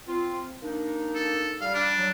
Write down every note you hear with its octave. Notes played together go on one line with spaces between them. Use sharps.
C4 F4
A#3 D4 D#4
A4
G3 F5
D4
F#3